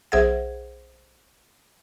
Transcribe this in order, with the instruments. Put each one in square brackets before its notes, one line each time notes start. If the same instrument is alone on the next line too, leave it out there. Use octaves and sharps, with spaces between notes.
[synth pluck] B1 G#4 G#6 [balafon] C5 E5 F#5